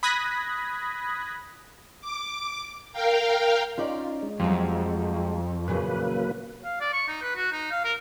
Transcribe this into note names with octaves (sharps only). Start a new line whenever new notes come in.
B5 D#6 F#6 G#6 A#6 B6
D6
A#4 F5 G5
C#4 D#4 F4 D5
G#3
F2 F#3 G3
A#2 C#3 E3 F#3 A#3 B4
F5
D5
C#6
D#4
B4
F#4
D#4
F5
A#4